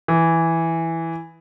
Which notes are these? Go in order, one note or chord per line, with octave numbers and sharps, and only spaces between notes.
E3